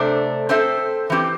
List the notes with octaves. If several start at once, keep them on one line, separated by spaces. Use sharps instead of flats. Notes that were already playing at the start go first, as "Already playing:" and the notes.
Already playing: C3 A3 D4 C5
C4 A4 C5 E5
E3 C4 G4